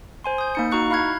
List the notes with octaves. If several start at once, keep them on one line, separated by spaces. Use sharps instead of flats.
C5 G#5 C6
D#6 G6
A#3 D#4 C#7
D#4 F#4 A#5 C#6 F#6 C#7
E4 F5 B5 F6 F#6 G#6